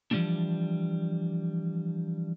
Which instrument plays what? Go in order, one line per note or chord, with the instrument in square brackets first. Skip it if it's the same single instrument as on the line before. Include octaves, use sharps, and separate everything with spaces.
[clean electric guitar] E3 F3 G3 A3 C4 D4